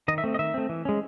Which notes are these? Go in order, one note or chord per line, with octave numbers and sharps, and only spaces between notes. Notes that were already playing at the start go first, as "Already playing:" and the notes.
D#3 D#5
E5
A3 C4
D#5
D#3 E5
A3 C4
E3
G#3 C#4